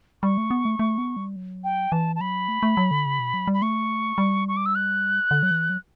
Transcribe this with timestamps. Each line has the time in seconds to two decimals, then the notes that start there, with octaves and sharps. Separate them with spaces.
0.23 G3 C#6
0.38 A3
0.51 B3
0.65 A3
0.79 A3
0.98 B3
1.16 G3
1.36 F#3
1.64 G5
1.92 E3 A5
2.16 A5
2.20 F#3 B5
2.48 A3
2.63 A3
2.77 F#3
2.91 D3
3.06 C#3
3.19 B2
3.34 F#3
3.48 G3
3.54 B5
3.62 A3 C#6
4.18 G3
4.48 C#6
4.57 D6
4.66 E6
4.75 F#6
5.31 D3
5.43 F#3
5.51 E3
5.70 F#3